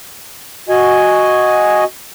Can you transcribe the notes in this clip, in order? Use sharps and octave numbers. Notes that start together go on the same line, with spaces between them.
F#4 D#5 G#5